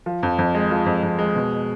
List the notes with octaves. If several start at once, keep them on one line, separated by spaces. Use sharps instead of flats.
F3
F2
F2
G#3
F3
F2
F2
G#3
B2